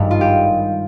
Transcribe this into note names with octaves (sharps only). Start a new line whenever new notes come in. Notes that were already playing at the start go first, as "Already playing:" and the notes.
Already playing: G#1 G2 G3
F4
G4